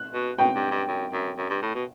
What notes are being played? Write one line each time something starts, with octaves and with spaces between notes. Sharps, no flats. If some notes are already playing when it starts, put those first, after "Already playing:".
Already playing: F#6
B2
B2 G5
G2
G2
F#2
F#2
F#2
G2
A2
B2